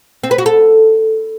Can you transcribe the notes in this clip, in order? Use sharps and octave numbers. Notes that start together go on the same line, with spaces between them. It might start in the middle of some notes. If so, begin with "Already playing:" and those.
C4
B4
F#4
A4